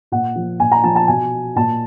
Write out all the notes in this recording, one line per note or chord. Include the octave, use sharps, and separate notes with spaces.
A#2 F#5
F3
A#2 G#5
A#5
F3 A5
A5
B2 G#5
A#2 A5